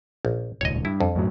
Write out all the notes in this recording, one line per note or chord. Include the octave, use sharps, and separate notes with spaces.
A#1
D#1 C#2 C#5 D#5
G2 E4
F2
F#2 A2 F#3